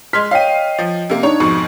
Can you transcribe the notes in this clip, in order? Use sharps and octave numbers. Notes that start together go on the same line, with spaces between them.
G#3 C6 F6 B6
C#5 D#5 F5 G5 D#7
F3
C3 A#3
D4 D#4 C#5
F2 G#2 B2 C#6